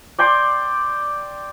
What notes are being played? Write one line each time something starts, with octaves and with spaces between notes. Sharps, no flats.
D5 G5 C6 D6